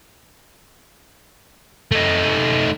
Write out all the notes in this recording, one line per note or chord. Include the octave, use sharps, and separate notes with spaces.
A3 D#4